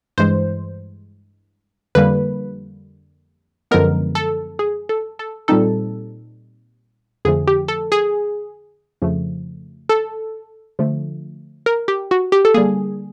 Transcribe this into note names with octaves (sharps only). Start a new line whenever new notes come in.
G2 E3 G#3 C5
F2 D3 G3 A#3 B4
F#2 D3 F3 G#3 B3 A#4
A4
G#4
A4
A4
A#2 G3 C4 D#4 A4
F2 D3 F3 A3 G#4
G4
A4
G#4
F2 C#3 F3 A3
A4
D3 F3 A3
A#4
G4
F#4
G4
A4
D3 G3 A#3 G#4